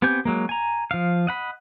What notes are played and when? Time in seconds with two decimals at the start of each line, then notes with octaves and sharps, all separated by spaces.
0.02 B3 C4 G4 G#5 G6
0.25 F#3 G#3 A#3
0.49 G#5 A#5
0.91 F3 F5
1.27 D#5 F#5 B5